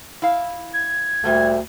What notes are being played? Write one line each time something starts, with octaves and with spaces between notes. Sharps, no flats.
E4 F5
G#6
D2 A#2 G3 A3